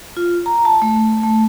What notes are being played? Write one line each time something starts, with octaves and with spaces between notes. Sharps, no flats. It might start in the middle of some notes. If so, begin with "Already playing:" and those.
F4
A#5
A5
A3
A3